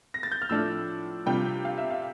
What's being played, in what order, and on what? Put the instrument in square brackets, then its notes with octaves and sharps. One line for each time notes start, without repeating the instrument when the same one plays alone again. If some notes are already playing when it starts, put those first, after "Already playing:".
[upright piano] A#6
A6
G6
F6
A2 F3 A3 D4 E6
C3 G3 D4 F4 G5
F5
E5
F5